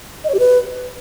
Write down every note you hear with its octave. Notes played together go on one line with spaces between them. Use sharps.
D#5
C#5
G4
B4